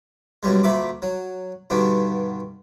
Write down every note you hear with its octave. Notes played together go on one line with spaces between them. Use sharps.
B1 F#2 G3 G#3
D2 A#2 E5 B5 D6
F#3
G2 B2 D3 D#3